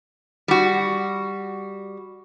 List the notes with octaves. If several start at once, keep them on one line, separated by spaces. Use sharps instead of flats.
G3 F#4